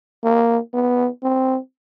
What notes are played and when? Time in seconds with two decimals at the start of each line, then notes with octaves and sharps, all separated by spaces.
0.23 A#3
0.73 B3
1.23 C4